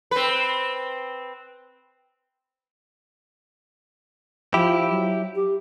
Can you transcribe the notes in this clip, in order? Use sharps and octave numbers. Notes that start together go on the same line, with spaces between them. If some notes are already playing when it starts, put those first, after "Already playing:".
C4 B4
F3 E4 G4
F#3
G4